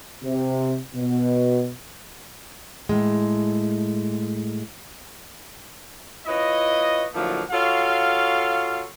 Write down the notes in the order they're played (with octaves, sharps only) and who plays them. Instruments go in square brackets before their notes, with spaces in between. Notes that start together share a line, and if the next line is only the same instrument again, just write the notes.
[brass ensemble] C3
B2
[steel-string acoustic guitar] A2 G#3
[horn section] E4 F4 B4 C#5 D#5
A2 D3 F3 F#3 A3 A#3
F4 F#4 A4 C#5 F5